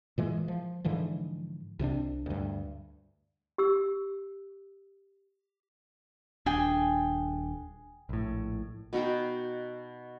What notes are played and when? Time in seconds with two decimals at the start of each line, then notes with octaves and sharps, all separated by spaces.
0.18 A#2 E3 G#3
0.48 F3
0.85 G#2 D3 E3 F3
1.79 C2 C3 D#3 D4
2.26 D2 G2
3.58 G4 E6
6.46 D#1 D4 G#4 G5 G#5
8.09 A#1 A2
8.93 B2 D#4 F#4 G5